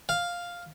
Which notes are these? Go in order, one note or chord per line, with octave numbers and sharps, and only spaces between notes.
F5